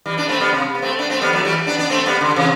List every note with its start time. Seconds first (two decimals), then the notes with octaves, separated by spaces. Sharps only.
0.06 E3 G3
0.18 B3 D4
0.28 A3 C4
0.40 G3 B3
0.53 C3
0.75 B3
0.82 A3 C4
0.99 B3 D4
1.10 A3 C4
1.21 G3 B3
1.33 F#3 A3
1.45 E3 G3
1.67 B3 D4
1.78 B3 D4
1.90 A3 C4
2.06 G3 B3
2.21 D3
2.36 C3 E3